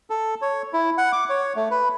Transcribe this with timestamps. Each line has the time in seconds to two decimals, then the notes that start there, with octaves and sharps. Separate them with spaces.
0.10 A4
0.42 C#5
0.73 E4
0.98 F#5
1.12 D6
1.29 C#5
1.56 A3
1.71 B4